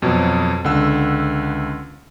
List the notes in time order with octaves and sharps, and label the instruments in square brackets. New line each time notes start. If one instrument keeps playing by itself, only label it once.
[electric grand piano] F2 B2 F#3
C#2 D3 F#5 E6